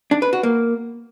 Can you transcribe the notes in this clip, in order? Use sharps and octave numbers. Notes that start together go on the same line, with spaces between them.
D4
B4
F#4
A#3